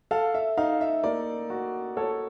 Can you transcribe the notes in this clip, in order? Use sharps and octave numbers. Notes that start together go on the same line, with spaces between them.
A4 F5
E5
D#4 F5
E5
A#3 D5
F#4
A4 C#5